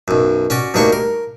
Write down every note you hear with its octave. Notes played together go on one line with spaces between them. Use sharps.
B1 F#2
C#4 F#4 D5
D2 G2 D#3 A#3 D4 C#6
A#4